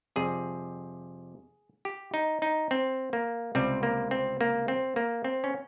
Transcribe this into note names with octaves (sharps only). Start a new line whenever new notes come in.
F2 C3 G3 G#4
G4
D#4
D#4
C4
A#3
C#2 C3 G3 C4
A#3
C4
A#3
C4
A#3
C4
C#4